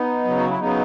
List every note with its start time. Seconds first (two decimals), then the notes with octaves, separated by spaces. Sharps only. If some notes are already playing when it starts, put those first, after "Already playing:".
Already playing: B3 D#4
0.24 C#3 F#3
0.37 F#4
0.49 E4
0.59 C#3 F#3 B3 D#4